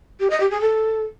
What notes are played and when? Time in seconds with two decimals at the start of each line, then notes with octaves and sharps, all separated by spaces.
0.20 G4
0.30 D#5
0.40 G4
0.51 G#4
0.61 A4